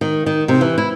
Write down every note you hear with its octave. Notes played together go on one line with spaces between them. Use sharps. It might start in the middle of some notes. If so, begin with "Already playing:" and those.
D#3
D#3
C3
E3
E4